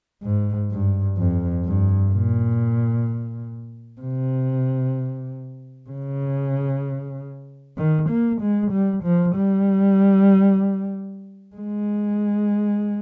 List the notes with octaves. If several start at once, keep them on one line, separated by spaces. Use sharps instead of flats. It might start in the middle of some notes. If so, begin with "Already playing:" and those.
G#2
G2
F2
G2
A#2
C3
C#3
D#3
A#3
G#3
G3
F3
G3
G#3